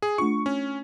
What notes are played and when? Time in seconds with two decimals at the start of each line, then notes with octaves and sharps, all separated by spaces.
0.02 G#4
0.18 A3 D4 F4 C#6
0.46 C#4